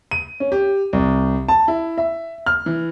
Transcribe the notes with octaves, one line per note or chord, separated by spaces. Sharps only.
D#7
C#4
G4
C2
A5
E4
E5
F6
E3